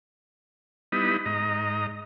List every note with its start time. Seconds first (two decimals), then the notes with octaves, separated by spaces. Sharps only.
0.92 G3 B3 D#4 E4 B5 D#6
1.25 G#2 D#5 A#5